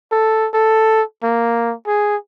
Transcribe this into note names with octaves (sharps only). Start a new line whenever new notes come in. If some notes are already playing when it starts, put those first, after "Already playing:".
A4
A4
A#3
G#4